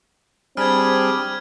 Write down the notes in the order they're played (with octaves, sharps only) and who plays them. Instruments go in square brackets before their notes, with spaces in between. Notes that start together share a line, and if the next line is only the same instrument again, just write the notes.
[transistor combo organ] G3 D4 G#4 [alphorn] C4 [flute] B5 [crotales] F6 G#6